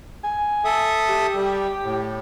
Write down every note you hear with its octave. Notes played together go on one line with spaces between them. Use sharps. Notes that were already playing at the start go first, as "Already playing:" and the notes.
G#5
A4 E5 D#6
G4
G3
A2